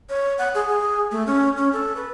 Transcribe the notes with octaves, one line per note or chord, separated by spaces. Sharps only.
C#5
F#5
G#4
G#4
A3
C#4
C#4
A4
B4